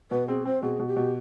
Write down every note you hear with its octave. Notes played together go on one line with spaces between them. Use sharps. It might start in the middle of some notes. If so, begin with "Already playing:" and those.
B2 B4
C4 G#4
C4 C5
B2 G#4
B2
G4
B2